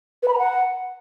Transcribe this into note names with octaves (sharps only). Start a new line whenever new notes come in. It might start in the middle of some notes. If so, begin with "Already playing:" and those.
B4
B5
A#5
F#5